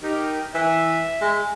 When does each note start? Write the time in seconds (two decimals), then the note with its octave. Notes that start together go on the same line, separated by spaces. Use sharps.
0.03 D#4 G4 A#4
0.54 E3 E5
1.21 G#3